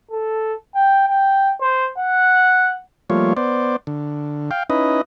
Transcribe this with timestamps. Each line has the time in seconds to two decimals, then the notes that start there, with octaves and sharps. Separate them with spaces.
0.11 A4
0.75 G5
1.08 G5
1.62 C5
1.98 F#5
3.10 F3 G3 A3 A#3 F4 C#5
3.37 B3 C5 D5
3.87 D3
4.51 F5 G5
4.70 C#4 D#4 E4 B4 D#5